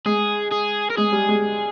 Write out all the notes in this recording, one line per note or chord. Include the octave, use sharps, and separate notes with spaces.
G#3 G#4
G#4
A#4
G#3 G#4
G3
G#3